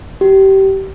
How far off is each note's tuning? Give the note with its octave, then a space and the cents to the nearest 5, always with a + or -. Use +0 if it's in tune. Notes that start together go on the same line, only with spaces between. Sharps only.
G4 -25